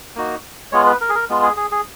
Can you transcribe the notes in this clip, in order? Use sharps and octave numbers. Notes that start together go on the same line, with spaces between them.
A#3 D#4 F#4
G#3 B3 F4 C#5
B4
A#4
G#4
A#4
G#3 B3 F4
G#4
G#4
G#4